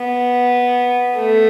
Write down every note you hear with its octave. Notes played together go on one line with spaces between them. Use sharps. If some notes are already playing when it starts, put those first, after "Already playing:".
Already playing: B3
A3